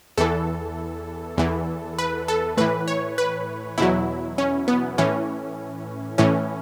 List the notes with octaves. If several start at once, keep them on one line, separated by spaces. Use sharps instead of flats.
E2 E3 A4
E2 E3
B4
A4
A2 E3 B4
C#5
B4
E2 B2 F#3 E4
C#4
B3
A2 E3 C#4
A2 E3 C#4